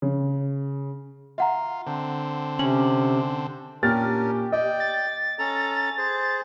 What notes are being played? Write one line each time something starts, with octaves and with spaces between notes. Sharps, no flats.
C#3
F4 E5 F#5 A#5
D3 C4
C3 C#4 F#7
A#2 C#4 D4 G4 A#4 F6 A6
D5 D#5 G5
A6
C#4 A4 A#5
G#4 C5